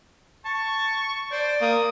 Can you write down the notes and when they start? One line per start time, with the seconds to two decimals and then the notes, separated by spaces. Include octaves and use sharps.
0.45 A5 C#6
1.32 C5 D5
1.61 A#3 D#6